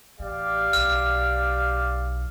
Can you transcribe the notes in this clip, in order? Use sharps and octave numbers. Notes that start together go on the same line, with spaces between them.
A1 G4 D5 F5
B1 F6